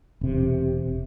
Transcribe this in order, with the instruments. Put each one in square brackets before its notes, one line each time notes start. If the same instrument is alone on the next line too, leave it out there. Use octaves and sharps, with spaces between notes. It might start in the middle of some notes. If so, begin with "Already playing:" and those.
[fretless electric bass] E1 C3